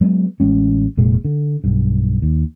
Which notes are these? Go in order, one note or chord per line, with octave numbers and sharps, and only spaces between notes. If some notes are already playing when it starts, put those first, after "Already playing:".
F#3 G#3 B3
A1 G#3 C#4
F1 A#2 G#3
D3
B1 G2
D#2